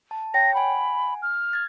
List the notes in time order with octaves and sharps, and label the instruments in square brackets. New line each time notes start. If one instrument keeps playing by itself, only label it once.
[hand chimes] A5
[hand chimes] C#5 G5 [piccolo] A#6
[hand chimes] F#5 G#5 [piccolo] B5
[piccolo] F6
[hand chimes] G#6 A6